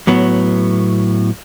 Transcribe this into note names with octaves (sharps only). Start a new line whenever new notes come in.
A2 F#3 B3